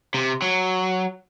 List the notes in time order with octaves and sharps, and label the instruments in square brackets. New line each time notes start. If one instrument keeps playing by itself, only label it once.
[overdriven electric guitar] C3
F#3